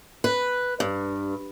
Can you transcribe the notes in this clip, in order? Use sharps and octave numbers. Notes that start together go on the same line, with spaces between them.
B4
G2